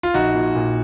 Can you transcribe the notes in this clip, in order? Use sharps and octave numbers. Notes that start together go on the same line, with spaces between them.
F4
A#1 D#4 F#4
A#2
A#2